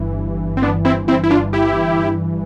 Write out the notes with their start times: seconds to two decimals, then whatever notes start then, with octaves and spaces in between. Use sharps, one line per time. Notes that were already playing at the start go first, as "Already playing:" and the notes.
Already playing: G1 G2 E3
0.57 C4
0.62 B3 D4
0.85 C4 E4
1.08 C4 E4
1.24 E4
1.31 D4 F4
1.53 E4 G4